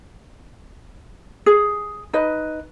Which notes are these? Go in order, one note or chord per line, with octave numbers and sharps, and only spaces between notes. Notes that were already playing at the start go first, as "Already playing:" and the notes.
G#4
D#4 B4 D#5